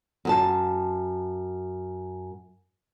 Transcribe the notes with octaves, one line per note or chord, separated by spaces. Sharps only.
F#2 G#4 A5